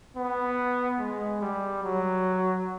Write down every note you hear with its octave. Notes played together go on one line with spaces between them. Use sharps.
B3
G#3
G3
F#3